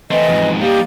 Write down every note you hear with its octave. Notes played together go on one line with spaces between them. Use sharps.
E3 A3 C4 D#5
F2 G#2
G3 A#3 D#4 G4